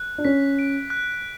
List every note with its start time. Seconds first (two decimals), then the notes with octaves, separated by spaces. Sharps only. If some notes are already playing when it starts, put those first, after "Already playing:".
Already playing: F#6
0.18 D4
0.25 C#4 B6
0.59 D7
0.90 F#6